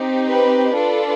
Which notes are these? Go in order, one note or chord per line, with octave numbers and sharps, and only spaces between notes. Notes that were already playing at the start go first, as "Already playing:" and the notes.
Already playing: C4 D#4 G4
B4
D4 F4 A4 B4